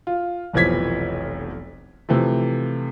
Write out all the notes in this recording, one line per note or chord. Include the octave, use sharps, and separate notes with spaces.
F4
F1 B1 E3 F3 G#6 B6
C3 E3 F3 A3